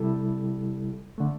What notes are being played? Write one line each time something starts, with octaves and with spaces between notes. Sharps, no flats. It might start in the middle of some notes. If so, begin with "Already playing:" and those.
Already playing: C3 G3 E4 A4
D3 A3